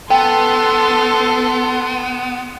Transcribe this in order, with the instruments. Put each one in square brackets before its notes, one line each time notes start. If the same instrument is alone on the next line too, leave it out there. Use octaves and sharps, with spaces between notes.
[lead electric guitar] B3 [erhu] A4 [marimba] G5 [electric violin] C6